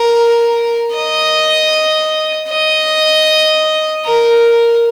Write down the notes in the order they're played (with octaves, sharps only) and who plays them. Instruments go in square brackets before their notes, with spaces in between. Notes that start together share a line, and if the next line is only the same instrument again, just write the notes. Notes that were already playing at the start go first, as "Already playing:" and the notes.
Already playing: [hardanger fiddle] A#4
D#5
D#5
A#4